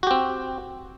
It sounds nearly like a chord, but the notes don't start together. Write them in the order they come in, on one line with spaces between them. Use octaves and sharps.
F#4 G4 C4